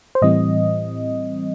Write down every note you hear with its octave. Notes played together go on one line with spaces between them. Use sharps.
C5
A2 E3 G3 C4 D#5